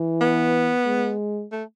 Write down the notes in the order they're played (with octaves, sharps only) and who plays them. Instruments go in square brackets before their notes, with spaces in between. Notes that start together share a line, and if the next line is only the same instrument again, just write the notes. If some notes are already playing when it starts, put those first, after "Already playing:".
Already playing: [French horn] E3
[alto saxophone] B3
[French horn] G#3
[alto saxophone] A3